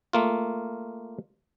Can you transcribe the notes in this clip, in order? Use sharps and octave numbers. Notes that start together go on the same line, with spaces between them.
A3 A#3 F4